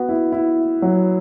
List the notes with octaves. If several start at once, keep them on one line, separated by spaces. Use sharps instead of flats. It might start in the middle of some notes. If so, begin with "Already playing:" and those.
Already playing: B3 F#4
E4
E4
F#3